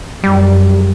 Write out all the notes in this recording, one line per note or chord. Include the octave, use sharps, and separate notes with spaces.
F#2 G3